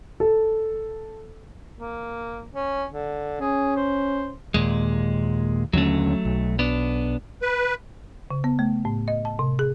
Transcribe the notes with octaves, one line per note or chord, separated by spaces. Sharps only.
A4
A#3
C#4
D3
C#4 G#4
C5
D#2 A#2 G#3
D#2 D3 F#3 A3 C#4
B1
B3 D4
B4
C#3
B3
A3
A2
D#5
A5
C3
G#4